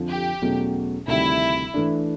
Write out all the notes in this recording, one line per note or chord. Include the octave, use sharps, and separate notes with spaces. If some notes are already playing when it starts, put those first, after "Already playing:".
Already playing: F2 D3 F3
G4
E2 B2 F#3 A3 C#4
D2 C3 D#3 G3 E4
E3 A3 D4